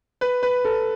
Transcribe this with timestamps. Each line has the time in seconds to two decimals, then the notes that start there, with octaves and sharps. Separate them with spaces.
0.21 B4
0.43 B4
0.65 A4